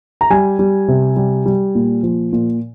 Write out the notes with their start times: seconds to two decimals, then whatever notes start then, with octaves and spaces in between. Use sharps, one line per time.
0.21 A#5
0.30 G3 G#5
0.59 G3
0.88 C3
1.16 G3
1.46 G3
1.75 A#2
2.03 F3
2.33 A#2